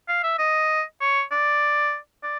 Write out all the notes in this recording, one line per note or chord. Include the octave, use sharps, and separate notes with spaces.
F5
E5
D#5
C#5
D5
D5